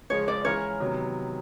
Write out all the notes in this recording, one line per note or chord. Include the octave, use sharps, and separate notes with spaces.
C#3 F3 G#3 C#5
D5
E3 G#3 C#4 F4 A#4 C#5
C3 D#3 F#3 B3